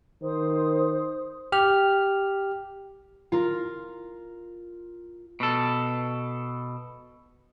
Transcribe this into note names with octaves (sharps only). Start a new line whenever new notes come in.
D#3 C5 D#6
G4 F6
F4 A#4
B2 A4